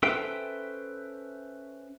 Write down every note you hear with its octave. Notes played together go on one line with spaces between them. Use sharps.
C#4 A4 B4 C5 E5 G5